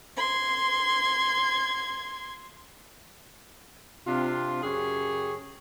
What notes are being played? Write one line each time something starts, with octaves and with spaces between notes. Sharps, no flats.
C6 G#6
C3 C4 D4 F4
F#2 C#3 G4 G#4 C#5